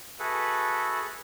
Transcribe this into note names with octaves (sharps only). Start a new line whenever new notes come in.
F#4 G#4 A4 B4 E5 F#5